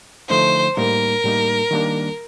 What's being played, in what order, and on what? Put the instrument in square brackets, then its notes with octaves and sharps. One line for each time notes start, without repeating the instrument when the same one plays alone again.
[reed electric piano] D3 F3 A3 D#4 [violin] C5
[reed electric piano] A2 G3 A#3 D#4 [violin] A#4
[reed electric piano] A2 G3 A#3 D#4
D#3 G3 A#3 D4